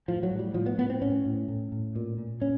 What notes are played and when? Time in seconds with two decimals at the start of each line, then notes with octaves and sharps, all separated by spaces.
0.08 A2 F3
0.23 F#3
0.31 A2
0.39 G3
0.54 A2 F3
0.66 B3
0.78 A2 B3
0.90 C4
1.01 A2 C#4
1.26 A2
1.48 A2
1.72 A2
1.96 A#2
2.18 A#2
2.42 A#2 C#4